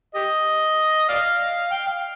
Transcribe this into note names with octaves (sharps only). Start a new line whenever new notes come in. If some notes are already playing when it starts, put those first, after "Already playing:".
G4 D#5
D5 F5
G5
F5